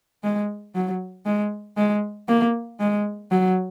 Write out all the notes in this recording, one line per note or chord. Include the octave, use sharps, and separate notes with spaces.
G#3
F#3
G#3
G#3
A#3
G#3
F#3